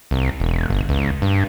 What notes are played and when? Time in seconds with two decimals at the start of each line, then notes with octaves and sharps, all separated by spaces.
0.11 C2
0.40 E1
0.70 G1
0.89 C#2
1.22 G2